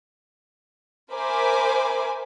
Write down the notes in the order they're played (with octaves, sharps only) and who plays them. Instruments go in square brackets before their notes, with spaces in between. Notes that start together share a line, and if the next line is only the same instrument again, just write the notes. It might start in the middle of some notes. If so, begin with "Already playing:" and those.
[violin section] A#4 C5 E5 G#5 B5 D6